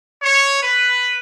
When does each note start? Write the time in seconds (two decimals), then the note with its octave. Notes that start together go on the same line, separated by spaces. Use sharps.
0.23 C#5
0.63 B4